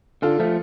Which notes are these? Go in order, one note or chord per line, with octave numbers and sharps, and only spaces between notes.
D3 F4 A4
F3 A3